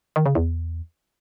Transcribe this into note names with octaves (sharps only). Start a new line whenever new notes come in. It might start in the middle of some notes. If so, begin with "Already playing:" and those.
D#3
C#3
E2